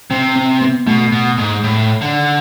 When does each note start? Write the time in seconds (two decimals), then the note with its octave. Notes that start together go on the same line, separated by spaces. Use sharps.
0.11 C3 C4
0.36 C4
0.62 B3
0.87 B2 A3
1.12 B2
1.38 G#2
1.64 A2
2.02 D3